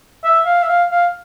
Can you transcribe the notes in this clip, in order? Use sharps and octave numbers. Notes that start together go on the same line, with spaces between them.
E5
F5
E5
F5
F5